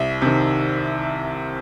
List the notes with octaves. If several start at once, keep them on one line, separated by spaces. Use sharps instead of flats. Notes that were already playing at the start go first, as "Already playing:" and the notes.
Already playing: C2 E5
C3 D#3